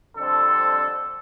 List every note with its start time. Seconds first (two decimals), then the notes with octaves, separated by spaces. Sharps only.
0.17 F2 D3 G3 C4 A4